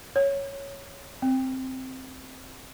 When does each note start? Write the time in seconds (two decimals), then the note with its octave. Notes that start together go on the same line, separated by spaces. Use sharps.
0.16 C#5
1.22 C4